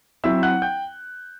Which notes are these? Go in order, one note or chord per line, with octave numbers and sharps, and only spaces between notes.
F#3 C4 E4 E5 E6
F#5 F#6
G5 G6